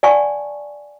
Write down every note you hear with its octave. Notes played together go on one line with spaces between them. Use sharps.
D5 F#5 G#5 A5 C#6